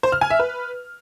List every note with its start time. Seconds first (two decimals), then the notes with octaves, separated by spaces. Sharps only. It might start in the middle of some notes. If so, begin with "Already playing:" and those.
0.03 C5
0.12 F6
0.21 G#5
0.30 E5
0.39 B4